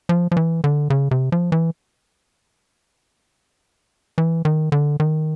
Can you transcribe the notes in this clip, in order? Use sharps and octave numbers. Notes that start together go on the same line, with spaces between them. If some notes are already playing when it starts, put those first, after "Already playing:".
F3
F3
E3
D3
C#3
C3
F3
E3
E3
D#3
D3
D#3